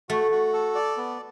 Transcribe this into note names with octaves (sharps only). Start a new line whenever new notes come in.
A3 F#4
F#4
A4
D5
B3